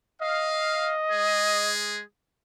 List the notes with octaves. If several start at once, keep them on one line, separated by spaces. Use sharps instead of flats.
D#5 F5
G#3 G#4